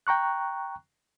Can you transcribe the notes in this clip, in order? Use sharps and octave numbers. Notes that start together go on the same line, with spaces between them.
G5 A#5 C#6 F#6